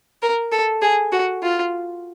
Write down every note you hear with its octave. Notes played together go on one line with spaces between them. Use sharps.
A#4
A4
G#4
F#4
F4